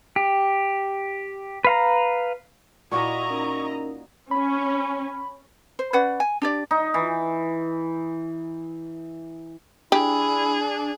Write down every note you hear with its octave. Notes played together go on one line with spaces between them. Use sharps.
G4
B4 F5 A#5
A#2 E4 F#4 D#5 A#5 C#6
C#4 D#4 A#4
C#4 B5
C5
C#4 B4 D5 F#5
G#5
D4 G4 D5
D#4
E3
D4 E4 G4 G#4